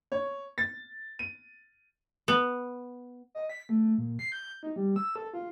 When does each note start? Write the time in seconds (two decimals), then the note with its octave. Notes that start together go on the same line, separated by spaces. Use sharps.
0.12 C#5
0.58 A6
1.19 D#7
2.28 B3
3.35 D#5
3.50 B6
3.69 A3
3.98 A#2
4.19 C7
4.32 G6
4.63 D#4
4.76 G3
4.96 E6
5.16 A4
5.34 F4